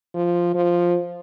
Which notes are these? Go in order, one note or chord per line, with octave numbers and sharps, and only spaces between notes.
F3
F3